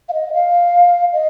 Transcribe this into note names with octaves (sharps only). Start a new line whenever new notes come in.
F5
D#5
F5
D#5